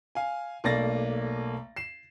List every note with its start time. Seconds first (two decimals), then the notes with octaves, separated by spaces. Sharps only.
0.15 F5 G#5
0.64 B1 A3 A#3 D5 A6 A#6
1.76 C7 E7